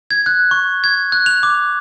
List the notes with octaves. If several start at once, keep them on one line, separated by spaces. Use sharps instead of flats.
G#6
F#6
C#6
G#6
F#6
F7
D6